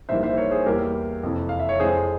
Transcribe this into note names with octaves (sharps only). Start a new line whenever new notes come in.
A#1 G#2 E3 G3 A#3 C5 E5
C5 E5
A#4 C#5
G#4 C5
E2 E3 G3 A#3 G4 A#4
F2 C3 E3
F5
E5
C#5
F2 E3 G#3 G#4 C5